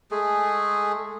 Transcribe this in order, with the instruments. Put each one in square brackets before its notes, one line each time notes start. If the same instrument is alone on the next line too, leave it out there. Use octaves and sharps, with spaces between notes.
[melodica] G#3 A3 G#4